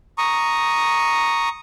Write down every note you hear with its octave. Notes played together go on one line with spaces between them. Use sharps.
A#5 C#6 D#6